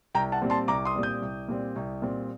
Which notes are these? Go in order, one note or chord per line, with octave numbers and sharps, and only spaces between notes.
C2 G5 A#5
F#5 A5
A#2 G3 C4
A5 C6
C2 A#5 D6
C6 D#6
A#2 G3 C4
D#6 G6
C2
A#2 G3 C4
C2
A#2 G3 C4